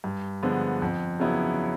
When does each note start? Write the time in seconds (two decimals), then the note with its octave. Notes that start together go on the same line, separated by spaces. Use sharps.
0.04 G2
0.43 D3 F3 G#3 B3
0.82 F2
1.20 C#3 F#3 B3 E4